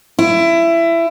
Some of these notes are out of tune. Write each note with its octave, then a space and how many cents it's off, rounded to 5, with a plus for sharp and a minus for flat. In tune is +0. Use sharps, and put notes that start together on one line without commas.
E4 +20